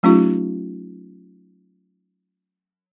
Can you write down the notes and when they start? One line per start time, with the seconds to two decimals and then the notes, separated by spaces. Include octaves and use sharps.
0.03 F#3 A3 C#4 D#4 F4 G4